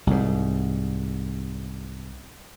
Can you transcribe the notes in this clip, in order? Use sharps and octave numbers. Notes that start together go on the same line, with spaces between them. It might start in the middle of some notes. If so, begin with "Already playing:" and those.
C2 G#2